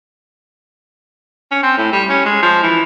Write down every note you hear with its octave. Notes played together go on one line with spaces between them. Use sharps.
C#4
C4
A2
G3
C#4
G#3
F3
E3